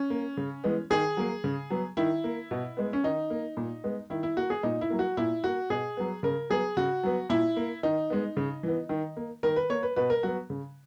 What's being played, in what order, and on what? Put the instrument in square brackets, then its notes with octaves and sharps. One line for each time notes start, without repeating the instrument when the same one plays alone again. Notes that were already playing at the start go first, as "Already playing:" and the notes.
Already playing: [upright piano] C#4
A#3
C#3
E3 G#3 B3
D#3 G#4
F#3 A#3
C#3
F#3 B3
D#3 E4
A#3
B2
G#3 B3
C#4
D#3 D#4
A#3
A#2
G#3 B3
D#3 E4
E4
A#3 F#4
G#4
A#2 D#4
E4
F#3 A#3
F#4
A#2 E4
A#3 F#4
B2 G#4
F#3 B3
C#3 A#4
F#3 B3 G#4
C#3 F#4
F#3 B3
A#2 E4
A#3
D#3 D#4
G#3 B3
C#3
E3 B3
D#3
A#3
D#3 A#4
B4
A#3 C#5
B4
B2 B4
A#4
F#3 B3 F#4
C#3